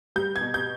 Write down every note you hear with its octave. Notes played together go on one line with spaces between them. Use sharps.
G3 G6
G#6
B2
G6